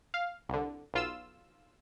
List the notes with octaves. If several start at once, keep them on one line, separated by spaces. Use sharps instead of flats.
F5
C2 D3
B1 F4 E6